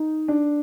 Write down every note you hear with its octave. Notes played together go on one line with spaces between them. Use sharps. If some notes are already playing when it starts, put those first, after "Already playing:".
Already playing: D#4
D4